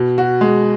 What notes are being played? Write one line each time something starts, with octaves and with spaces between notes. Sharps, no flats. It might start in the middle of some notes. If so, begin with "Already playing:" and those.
Already playing: B2
F#4
G#3